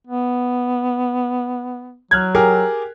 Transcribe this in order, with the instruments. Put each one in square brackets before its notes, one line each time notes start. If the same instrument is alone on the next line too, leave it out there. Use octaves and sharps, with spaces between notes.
[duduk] B3
[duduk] F#3 [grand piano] F6 F#6 G#6
[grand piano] G4 G#4 A#4